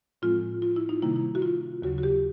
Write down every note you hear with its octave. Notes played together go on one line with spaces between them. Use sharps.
A2 F3 G#3 C4 F4
F4
E4
D#4
C3 D#3 G3 A#3 E4
E4
F#4
F4
D#2 C#3 F#3 F#4
F#4
G4